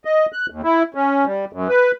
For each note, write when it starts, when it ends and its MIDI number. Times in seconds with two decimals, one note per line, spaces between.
0.05 0.26 75
0.33 0.46 90
0.50 0.61 39
0.64 0.83 64
0.95 1.25 61
1.25 1.45 55
1.53 1.68 42
1.69 1.92 71